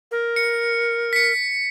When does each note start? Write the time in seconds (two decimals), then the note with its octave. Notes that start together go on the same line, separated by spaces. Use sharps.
0.11 A#4
0.36 C#7
1.13 B6 C#7